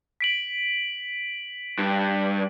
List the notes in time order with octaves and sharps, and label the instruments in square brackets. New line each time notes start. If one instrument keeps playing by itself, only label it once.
[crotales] B6 D7 F#7
[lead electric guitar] G2